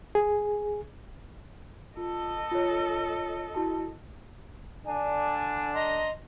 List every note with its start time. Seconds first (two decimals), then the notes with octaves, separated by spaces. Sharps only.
0.15 G#4
1.97 F4 A4 D#5
2.52 F4 C#5
3.55 E4 F#4 A5
4.86 D3 D4 G#5
5.74 D#5 A#5 C6